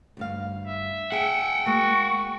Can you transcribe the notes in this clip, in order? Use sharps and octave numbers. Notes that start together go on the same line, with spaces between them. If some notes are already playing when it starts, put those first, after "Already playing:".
D2 G2 F5
E5
G#4 F#5 G5 C#7
G#3 A#3 F#4 C#6